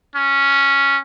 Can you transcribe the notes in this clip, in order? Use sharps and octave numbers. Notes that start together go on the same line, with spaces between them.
C#4